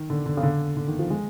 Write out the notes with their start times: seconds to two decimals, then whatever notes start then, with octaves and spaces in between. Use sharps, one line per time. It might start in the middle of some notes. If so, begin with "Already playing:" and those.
Already playing: D#3
0.10 D3
0.26 D3
0.37 C#3
0.43 D3
0.77 D3
0.88 D#3
0.99 F3
1.10 G#3